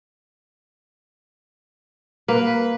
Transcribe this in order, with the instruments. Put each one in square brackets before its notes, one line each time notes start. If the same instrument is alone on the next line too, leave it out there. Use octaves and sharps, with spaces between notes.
[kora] A#3 [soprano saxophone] B4